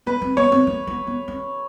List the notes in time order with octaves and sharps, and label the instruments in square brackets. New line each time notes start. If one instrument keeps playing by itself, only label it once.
[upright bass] B3 [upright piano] B4
[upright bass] C4
[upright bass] B3 [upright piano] C#5
[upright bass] C4
A#3
B3
B3
C#4